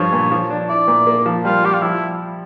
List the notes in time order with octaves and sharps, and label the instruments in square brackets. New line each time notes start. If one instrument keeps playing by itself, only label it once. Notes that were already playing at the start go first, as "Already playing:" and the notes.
Already playing: [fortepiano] G2 F3 [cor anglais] C#5
[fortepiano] A#2
F3
D4
[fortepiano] E4 [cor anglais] D5
[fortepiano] A#2
A#3
F3
[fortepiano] G3 [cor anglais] F4
[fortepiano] G3 [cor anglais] G4
[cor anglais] F4
[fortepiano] F3 [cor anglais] E4